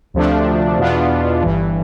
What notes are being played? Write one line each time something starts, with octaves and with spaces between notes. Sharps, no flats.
D2 C3 F3 A3 D4
E2 B2 B3 D4 F4
G1 G2 E3